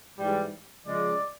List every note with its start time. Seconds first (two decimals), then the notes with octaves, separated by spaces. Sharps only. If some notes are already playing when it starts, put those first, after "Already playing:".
0.18 G#2 E3 G3
0.86 C#3 F3 G#3 D5